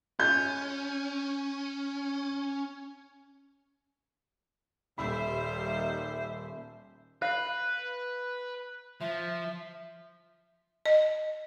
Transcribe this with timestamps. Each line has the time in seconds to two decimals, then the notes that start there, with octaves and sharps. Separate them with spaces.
0.20 C#4 G6
4.98 D#1 D#2 G3 C5 E5 B5
7.22 B4 F5 F#6
9.01 F3 E5
10.86 D#5